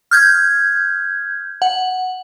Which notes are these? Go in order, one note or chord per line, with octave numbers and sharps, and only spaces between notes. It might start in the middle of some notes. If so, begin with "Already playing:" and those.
F6 G6 G#6
F#5